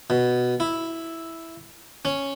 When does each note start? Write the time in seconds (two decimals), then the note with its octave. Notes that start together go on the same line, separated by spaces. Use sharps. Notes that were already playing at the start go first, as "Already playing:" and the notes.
0.10 B2
0.60 E4
2.05 C#4